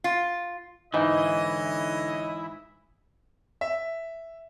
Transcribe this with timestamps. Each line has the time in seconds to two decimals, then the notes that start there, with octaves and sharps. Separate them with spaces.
0.04 F4
0.94 G#2 D3 E3 D#4 E4 C#5 D#5
3.61 E5